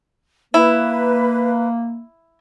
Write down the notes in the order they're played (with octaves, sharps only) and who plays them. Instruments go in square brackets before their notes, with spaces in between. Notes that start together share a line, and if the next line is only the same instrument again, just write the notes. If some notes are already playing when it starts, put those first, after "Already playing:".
[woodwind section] A#3 [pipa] E4 [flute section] B4